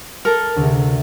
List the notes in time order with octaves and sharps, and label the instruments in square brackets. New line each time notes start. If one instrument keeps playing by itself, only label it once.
[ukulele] A4 A#4
[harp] D2 [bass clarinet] C3